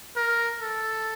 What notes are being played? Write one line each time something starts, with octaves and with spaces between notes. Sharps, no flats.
A#4
A4